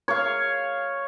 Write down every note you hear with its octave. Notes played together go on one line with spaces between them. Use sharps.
C#5 F5